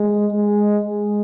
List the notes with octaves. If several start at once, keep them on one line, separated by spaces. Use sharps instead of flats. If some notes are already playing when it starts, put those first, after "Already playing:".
Already playing: G#3
G#3
G#3